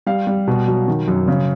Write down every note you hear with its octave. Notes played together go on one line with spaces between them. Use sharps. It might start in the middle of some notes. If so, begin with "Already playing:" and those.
G3 F5
G3
B2
F#3
D#3
F#2
C#3